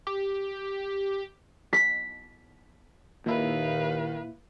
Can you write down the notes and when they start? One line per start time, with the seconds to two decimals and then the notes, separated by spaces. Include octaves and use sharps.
0.07 G4
1.73 B6
3.26 D#2 A#2 D#3 E4 B4 F5